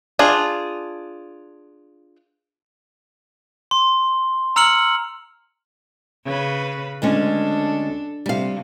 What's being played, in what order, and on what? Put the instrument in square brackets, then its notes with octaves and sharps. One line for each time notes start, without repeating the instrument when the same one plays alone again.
[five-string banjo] D4 F4 G#4
[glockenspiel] C6
A#5 E6 F6 C#7 F#7
[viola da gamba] C#3 B4
[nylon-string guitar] D2 G#3 C#4 [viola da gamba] D4 A4
[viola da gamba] C3 [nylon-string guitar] G3 F5